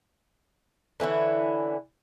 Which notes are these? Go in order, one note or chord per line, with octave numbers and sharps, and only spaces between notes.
D3 E3 C#4 E4